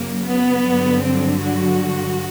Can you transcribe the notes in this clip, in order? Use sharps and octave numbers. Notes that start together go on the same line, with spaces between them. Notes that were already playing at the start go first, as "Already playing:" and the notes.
Already playing: F#2 C#3 F#3 A#3
B3
G2 D3 F#3
C4
F#4